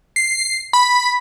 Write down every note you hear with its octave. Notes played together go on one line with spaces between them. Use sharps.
C7
B5